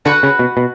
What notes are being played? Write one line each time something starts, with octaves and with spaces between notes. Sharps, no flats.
D3 F#4 B4 F#5
C#3
B2
B2